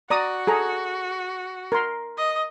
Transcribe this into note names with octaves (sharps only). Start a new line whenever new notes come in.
F#4 D5 A#5 D#6
G#4 A4 A#5
A#4 C6
D#5